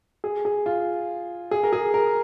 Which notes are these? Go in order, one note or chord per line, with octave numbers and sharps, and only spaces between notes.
G#4
G#4
F4
G#4
A#4
G#4
A#4